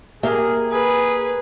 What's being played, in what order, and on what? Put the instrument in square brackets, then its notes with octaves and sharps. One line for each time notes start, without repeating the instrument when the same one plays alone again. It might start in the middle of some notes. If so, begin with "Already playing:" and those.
[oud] A#3 G4 E5 [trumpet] G#4
[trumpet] G#4 [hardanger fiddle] B4